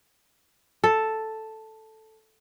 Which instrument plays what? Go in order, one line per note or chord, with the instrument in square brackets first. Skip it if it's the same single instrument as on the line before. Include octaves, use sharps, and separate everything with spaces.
[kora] A4